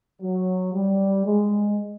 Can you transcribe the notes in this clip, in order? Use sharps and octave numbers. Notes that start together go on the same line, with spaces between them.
F#3
G3
G#3